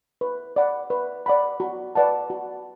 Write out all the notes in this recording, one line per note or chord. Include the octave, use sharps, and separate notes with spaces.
B4
D5 F#5 B5
B4
D5 F#5 B5
F#4
B4 D5 F#5 A5
F#4